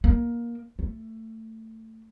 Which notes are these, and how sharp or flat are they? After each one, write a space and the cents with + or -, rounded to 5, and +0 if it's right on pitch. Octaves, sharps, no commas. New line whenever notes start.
A#3 +15
A3 +20